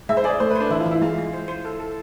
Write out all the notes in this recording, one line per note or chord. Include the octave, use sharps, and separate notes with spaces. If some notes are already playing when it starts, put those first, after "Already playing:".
G#3 E5
C5
G#4 D5
A3 C5
B4
D4 C5
E3 E4
F4
E3 E4
G#3 F4
G#3
C5
C5
A4
A4